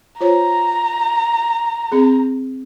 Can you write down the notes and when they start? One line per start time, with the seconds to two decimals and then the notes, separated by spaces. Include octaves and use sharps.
0.21 F4 C5 C#5 A#5
1.92 C4 G#4